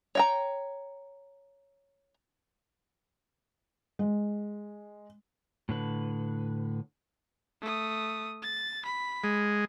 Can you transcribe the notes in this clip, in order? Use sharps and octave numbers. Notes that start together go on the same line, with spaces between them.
C#5 G5 A#5
G#3
A2 D3 B4
A3 D#6
A6
B5
G#3